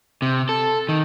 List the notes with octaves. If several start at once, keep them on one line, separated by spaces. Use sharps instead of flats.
C3
A4
D#3